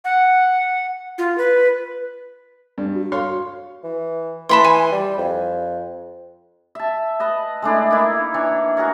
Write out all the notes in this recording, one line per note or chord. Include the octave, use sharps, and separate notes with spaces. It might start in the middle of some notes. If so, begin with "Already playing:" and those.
F#5
F4
B4
G2 D5
F#4
C#5 F5 C6
E3
E3 A5 B5 C6
G#5
G3
F2
E5 A5
B4 D#5 A5
G#3 A3 D4 E4
A#3 D#4 E4
E3 D4 C#5
F#4 G#4 A#4 C#5